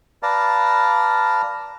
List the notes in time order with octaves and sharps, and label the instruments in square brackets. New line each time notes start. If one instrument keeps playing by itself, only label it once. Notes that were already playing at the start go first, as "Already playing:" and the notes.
[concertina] B4 D5 F5 A5 A#5